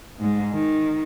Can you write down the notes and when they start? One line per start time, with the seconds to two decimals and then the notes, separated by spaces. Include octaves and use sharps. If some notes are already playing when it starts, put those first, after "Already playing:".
0.20 G#2 G#3
0.54 D#3